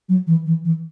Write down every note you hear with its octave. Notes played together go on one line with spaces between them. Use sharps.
F#3
E3
E3
E3